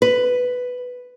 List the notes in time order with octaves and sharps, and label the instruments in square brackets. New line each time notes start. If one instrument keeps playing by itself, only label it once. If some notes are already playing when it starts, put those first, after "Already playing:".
[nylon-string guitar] B4